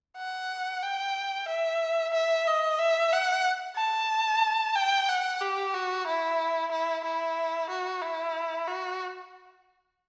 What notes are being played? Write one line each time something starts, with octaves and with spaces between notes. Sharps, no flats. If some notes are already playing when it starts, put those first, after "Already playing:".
F#5
G5
E5
E5
D#5
E5
F#5
A5
G5
F#5
G4
F#4
E4
E4
E4
F#4
E4
F#4